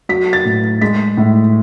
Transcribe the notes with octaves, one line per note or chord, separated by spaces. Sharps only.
F#3 B6
A6
A2
G#3 B6
A2